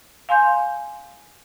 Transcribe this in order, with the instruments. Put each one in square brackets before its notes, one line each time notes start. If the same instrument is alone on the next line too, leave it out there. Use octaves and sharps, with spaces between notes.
[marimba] F5 G#5 C6 G6